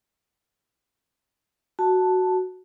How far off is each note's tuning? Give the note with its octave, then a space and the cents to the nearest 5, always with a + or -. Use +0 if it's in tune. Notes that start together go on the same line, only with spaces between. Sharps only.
F#4 +0 A5 +0